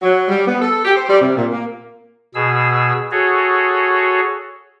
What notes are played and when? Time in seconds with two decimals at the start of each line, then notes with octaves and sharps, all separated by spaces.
0.02 F#3
0.28 G3
0.47 B3
0.61 A4
0.85 G4
0.96 C5
1.09 G3
1.21 C3
1.36 A#2
1.52 A#3
2.35 B2 G#4 E6
3.11 F#4 G#4 A4 C#5